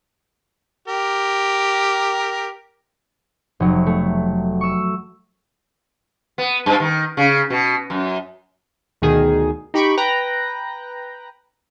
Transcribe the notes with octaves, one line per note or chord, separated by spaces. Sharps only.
G4 A#4
F1 F#3
A3
C#6 E6
B3
G2
D#3
C#3
B2
F#2
D2 B2 D#3 G#4
D#4 G4 B5 C#6 D7
B4 G5 A#5 F#6 A#6